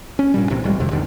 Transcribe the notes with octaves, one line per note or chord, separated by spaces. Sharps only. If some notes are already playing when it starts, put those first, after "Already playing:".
C#4
G2 A#2 G3
B1 A2 C3 E3
B1 A2 G3 G#3
F#1 F2 C3 D#3
A1 E2 D3 D#3